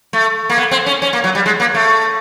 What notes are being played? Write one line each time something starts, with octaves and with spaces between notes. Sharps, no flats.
A3
A#3
B3
C4
C#4
C#4
A#3
F#3
G3
G#3
A#3
A3